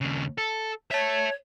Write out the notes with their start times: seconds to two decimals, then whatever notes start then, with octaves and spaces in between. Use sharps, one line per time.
0.01 D#2 C#3
0.38 A4
0.91 C#5 E5 A5